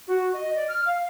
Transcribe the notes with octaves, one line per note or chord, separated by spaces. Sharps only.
F#4
D#5
D5
F6
F5